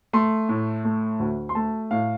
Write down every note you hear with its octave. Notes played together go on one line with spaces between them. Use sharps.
A3 C6
A2
A3
D2
C6
A3 A5
A2 F5